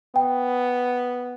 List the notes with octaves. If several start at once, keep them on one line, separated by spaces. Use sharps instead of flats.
B3 G5